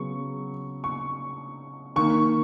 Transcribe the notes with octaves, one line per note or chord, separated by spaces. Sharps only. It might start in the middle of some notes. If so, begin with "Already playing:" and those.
Already playing: C#3 F#3 B3 C#6
C#6
D#3 A#3 C#6